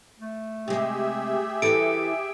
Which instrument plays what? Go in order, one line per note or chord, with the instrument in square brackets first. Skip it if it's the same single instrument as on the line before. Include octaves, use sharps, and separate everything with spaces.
[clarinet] A3
[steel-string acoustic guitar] C3 G#3 [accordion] G4 G#4 E5
[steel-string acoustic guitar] E3 A4 [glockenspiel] D7